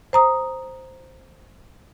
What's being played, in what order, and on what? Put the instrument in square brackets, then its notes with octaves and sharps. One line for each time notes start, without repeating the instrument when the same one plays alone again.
[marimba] C5 A#5 D#6